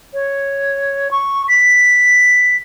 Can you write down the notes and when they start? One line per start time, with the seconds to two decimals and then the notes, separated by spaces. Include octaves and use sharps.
0.14 C#5
1.11 C#6
1.48 B6